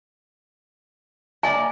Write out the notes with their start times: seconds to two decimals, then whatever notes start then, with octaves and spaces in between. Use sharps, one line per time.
1.43 A#3 D5 D#5 G#5